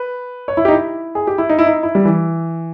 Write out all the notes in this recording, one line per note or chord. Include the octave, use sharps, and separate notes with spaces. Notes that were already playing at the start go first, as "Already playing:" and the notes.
Already playing: B4
C#5
E4
D#4 G4
E4
G#4
G4
E4
D#4
E4
D#4
E4
G3
E3